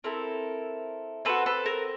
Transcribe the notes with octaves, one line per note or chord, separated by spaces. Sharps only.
C4 E4 A4 A#4
C4 D#4 F#4 A4 B4
A4 B4
A#4